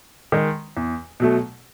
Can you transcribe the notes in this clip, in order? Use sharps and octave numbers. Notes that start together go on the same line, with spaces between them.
D#3 G#3
E2
B2 F#3 A3